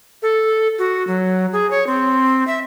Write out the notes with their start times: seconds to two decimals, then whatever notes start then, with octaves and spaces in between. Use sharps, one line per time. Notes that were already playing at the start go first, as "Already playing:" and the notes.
0.22 A4
0.79 F#4
1.07 F#3
1.53 G#4
1.71 C#5
1.87 C4
2.47 E5